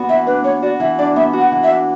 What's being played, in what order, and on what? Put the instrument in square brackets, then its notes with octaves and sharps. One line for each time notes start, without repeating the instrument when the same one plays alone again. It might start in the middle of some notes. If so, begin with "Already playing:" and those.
Already playing: [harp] B3 D4 F#4
[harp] E3 [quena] E5
[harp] D4 [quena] B4
[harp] B3 [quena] C#5
[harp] F#4 [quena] D5
[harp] E3 [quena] E5
[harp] D4 [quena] D5
[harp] B3 [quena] E5
[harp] F#4
[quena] F#5
[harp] E3
[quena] E5
[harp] D4